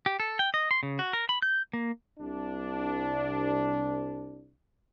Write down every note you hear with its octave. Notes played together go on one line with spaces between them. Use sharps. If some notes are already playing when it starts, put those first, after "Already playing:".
G4
A4
G5
D#5
C6
C#3
F#4
A#4
B5
G6
A#3
C2 D4